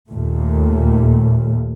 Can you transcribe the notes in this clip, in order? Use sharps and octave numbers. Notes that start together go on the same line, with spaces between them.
D#2 A#2 A3